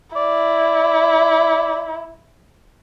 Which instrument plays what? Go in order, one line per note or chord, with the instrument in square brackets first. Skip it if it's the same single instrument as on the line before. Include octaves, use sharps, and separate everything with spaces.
[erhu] E4 [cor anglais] D5